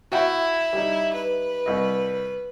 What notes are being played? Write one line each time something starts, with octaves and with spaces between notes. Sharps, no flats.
E4 F#4 E5 G5
G3 D#4
B4
C2 D#5